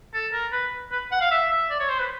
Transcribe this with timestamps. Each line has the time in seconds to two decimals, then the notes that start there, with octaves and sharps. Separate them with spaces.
0.14 A4
0.33 A#4
0.52 B4
0.92 B4
1.11 F#5
1.21 F5
1.31 E5
1.51 E5
1.70 D5
1.80 C#5
1.89 C5
1.99 B4